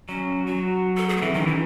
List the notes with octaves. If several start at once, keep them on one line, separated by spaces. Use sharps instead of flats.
F#3 C#4
F#3 F#4
A4
G#4
A3
E3 C4
D#3 C#4
E3 D#4